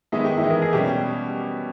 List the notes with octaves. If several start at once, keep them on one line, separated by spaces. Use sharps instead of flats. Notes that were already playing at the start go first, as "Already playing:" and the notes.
D#3 G#3 B3 D#4 E4
G4
E4
E3 G#3 D#4
A#4
G#4
B2 G3 C#4 G4